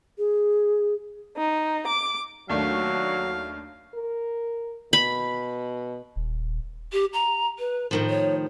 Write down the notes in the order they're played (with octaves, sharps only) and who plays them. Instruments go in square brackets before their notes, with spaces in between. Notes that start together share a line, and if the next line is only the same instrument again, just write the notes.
[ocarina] G#4
[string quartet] D#4
D6
[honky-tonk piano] D#2 A3 D4 [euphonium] F#3 [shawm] F5
[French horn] A#4
[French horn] B2 [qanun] B5
[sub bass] D#1
[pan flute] G4
A#5
B4
[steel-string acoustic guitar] A2 D#3 F3 [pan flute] A#4
[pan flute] C#5